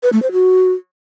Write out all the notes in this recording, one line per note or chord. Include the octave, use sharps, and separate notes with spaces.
B4
A3
C5
F#4